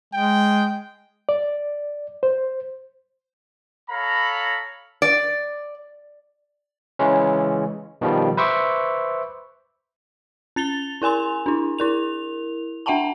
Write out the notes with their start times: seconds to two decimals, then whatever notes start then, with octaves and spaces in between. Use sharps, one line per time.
0.13 G#3 G5
1.29 D5
2.23 C5
3.90 A4 C#5 F5 A#5 B5
5.02 D5
6.99 C#3 E3 G#3 C#4
8.01 B2 D#3 F3 G3
8.37 B4 C5 E5 C#6 D6
10.56 C#4 A6 F7 G7
11.02 E4 A#4 G#5 C6 F7
11.46 D4 E4
11.78 E4 A#4 F7
12.86 D4 E5 F#5 G5 A5 A#5